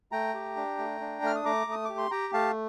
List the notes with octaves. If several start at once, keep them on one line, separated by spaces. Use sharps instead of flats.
A3 G5 A#5
G4
D4
A3
D4
A3 F6
D#6
A3 A#5 D6
A3 D#6
G4 D6
C6
G4 G5 A#5
A3 F5 A5